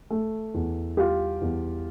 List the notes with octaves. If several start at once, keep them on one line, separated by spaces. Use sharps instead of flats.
A3
E2
G3 F4 G4
E2